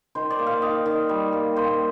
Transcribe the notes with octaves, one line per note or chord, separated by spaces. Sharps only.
D#3 C5
D5
A#3
F5
D#3 D#5
D#3
G3
A#3
A#3 C5